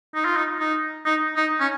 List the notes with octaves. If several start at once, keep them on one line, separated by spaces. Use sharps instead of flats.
D#4
F4
D#4
D#4
D#4
D#4
C#4